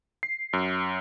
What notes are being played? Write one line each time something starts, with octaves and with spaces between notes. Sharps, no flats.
C7
F#2